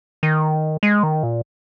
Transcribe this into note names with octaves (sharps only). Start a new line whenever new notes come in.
D#3
G#3
D#3
A#2